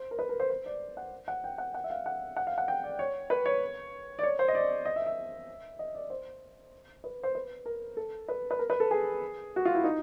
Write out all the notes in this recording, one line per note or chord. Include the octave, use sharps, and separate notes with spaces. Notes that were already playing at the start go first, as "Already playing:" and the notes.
Already playing: C5
A#4
B4
A#4
C5
C5
D5
F#5
F#5
G5
F#5
F#5
E5
F5
F#5
F#5
F5
F#5
G5
D5
C#5
B4
C#5
D5
C#5
C5
D#5
D5
D#5
E5
E5
D#5
D5
C5
B4
C5
B4
A#4
A4
B4
B4
A#4
B4
A4
G#4
F#4
F4
E4
D#4